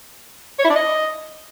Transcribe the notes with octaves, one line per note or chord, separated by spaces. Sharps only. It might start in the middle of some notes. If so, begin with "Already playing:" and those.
C#5
E4
D4
D#5